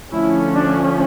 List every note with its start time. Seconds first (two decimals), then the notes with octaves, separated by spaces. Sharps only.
0.12 D3 F3 A3 C#4 E4
0.56 D4